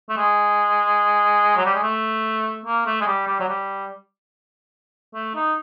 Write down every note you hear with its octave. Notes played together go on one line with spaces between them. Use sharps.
A3
G#3
F#3
G3
G#3
A3
A#3
A3
G#3
G3
G3
F#3
G3
A3
D#4